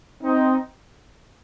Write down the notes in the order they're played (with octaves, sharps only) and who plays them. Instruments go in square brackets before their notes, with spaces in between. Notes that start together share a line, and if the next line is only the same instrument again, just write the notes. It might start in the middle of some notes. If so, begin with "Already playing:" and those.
[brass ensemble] C4 D#4